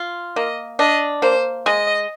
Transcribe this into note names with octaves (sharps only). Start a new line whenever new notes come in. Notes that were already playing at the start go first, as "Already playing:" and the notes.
Already playing: F4
A#3 D#5
D4 D#5
A#3 C5
G#3 D#5